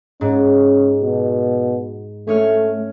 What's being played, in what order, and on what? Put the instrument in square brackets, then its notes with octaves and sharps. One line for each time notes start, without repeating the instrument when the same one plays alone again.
[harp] G#2 [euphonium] C#4
[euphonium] B2
[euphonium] A3 [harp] C#4 C#5 F6